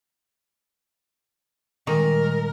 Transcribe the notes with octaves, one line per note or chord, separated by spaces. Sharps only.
A#2 D#3 G3 G#3 A#4